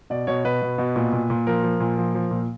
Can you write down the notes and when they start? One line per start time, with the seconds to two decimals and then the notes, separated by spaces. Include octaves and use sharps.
0.10 B2 D5
0.27 B2 C#5
0.44 B2 B4
0.62 B2
0.78 B2
0.96 A#2
1.12 A#2
1.30 A#2
1.47 F3 A#4
1.63 F3
1.80 A#2
1.98 F3
2.15 F3
2.31 A#2